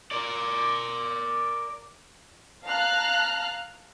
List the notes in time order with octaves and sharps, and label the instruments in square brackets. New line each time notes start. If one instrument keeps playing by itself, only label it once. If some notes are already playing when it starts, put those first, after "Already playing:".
[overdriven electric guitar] A#4 D5
[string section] F5 A5 A#5 F6 F#6